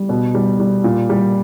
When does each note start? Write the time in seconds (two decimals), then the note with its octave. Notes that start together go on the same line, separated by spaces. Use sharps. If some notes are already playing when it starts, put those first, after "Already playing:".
Already playing: G3
0.09 B2
0.34 G3
0.59 G3
0.84 A#2
1.09 G3